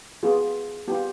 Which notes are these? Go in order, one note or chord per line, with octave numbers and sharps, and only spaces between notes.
B3 F4 G#4
B3 F4 G4